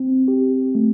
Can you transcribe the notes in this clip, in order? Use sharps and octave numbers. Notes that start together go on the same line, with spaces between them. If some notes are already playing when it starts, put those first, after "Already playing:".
Already playing: C4
G4
A3